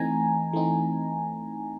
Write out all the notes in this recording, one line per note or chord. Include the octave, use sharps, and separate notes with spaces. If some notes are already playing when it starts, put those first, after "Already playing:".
Already playing: E3 A3 C4 D#4 G#5 A#5
E3 A3 C4 D#4